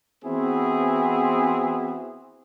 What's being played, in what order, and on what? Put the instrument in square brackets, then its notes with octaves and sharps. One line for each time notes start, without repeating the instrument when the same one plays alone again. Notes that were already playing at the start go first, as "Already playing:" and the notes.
[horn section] E3 B3 C4 E4 F#4 G#4